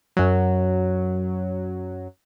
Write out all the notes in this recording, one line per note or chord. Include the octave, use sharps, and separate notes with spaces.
F#2 F#3